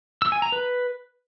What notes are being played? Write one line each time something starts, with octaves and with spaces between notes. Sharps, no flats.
E6
G#5
A#5
B4